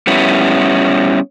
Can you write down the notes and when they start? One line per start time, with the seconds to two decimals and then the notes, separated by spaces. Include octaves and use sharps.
0.07 G3 B3 C#4 E4